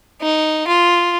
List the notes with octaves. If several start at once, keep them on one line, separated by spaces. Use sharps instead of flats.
D#4
F4